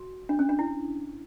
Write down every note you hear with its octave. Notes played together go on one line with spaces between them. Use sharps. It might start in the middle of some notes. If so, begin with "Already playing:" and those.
Already playing: F#4
D4
C#4
D4
E4